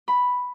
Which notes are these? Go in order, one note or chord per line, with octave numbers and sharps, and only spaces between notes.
B5